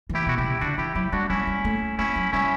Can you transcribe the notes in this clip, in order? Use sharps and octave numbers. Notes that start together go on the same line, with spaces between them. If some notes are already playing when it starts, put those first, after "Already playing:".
E3
E4 G4
B2 F#4
D3 E4 G4
C#3
D3 D4 F#4
E3 E4 G4
F#3 E4 G4
G3 D4 F#4
G3 C#4 E4
G3
A3
A3 C#4 E4
F#3
G3 C#4 E4